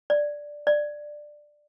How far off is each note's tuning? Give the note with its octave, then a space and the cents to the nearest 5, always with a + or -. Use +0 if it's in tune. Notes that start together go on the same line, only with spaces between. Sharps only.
D5 +0
D5 +10